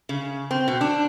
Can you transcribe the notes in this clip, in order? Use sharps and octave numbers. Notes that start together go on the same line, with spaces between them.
C#3
C4
B2
D4